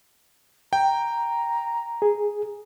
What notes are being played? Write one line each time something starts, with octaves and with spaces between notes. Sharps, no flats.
G5 A#5
G#4